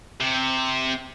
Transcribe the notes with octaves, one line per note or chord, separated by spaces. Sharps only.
C3